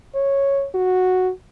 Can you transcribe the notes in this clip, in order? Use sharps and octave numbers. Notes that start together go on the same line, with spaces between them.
C#5
F#4